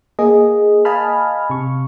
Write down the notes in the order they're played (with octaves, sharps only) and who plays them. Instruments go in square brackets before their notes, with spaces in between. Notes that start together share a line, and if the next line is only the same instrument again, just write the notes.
[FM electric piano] A#3 G#4 D#5
D#5 F5 G#5 A5 B5 F6
C3 C#6